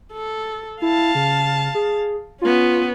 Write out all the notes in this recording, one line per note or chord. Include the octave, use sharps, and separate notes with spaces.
A4
E4 F5 A5
C#3
G#4
B3 C#4 F4